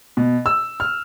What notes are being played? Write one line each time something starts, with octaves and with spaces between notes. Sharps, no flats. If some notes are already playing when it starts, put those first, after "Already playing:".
B2
E6
F6